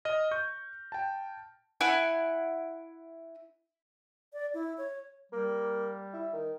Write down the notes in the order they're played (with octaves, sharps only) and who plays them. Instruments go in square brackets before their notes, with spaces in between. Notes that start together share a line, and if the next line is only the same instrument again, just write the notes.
[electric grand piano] D#5 F6 A#6
C#6 G6
G5 A5
[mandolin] E4 F#5 G#5
[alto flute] D5
E4
C#5
[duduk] G3 [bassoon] A#3
[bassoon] E4
D#3